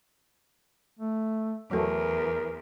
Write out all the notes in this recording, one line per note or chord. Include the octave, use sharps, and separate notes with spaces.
A3
E2 F#3 A3 A#4